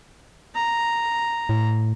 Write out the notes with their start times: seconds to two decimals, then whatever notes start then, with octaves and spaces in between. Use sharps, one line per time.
0.55 A#5
1.49 A2